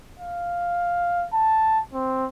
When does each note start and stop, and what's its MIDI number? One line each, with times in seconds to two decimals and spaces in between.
0.19 1.25 77
1.34 1.80 81
1.94 2.26 60